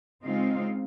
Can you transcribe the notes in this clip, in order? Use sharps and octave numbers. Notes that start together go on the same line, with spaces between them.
C#3 G#3 C4 D#4 F4 F5